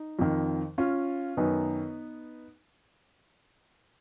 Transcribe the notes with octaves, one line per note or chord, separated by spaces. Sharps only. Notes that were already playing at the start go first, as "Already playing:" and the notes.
Already playing: D#4
F2 D#3
C#4 F4
F#2 D#3 B3 D#4